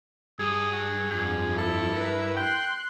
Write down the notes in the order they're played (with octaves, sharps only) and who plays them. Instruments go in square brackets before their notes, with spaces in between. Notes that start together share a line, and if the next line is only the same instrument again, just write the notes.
[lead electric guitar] G2 [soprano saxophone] G#4 [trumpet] D#6
[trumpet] F#4
[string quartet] F2 F3 [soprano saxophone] G#4
[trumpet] E4 [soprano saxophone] A4
[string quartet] A#4 B4 E5
[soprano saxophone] G5 [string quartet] C6 F#6